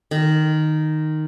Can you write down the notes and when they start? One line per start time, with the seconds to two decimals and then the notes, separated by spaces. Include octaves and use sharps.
0.11 D#3